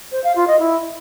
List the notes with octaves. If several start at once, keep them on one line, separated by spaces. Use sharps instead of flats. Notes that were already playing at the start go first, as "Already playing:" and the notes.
C5
F5
F4
D#5
E4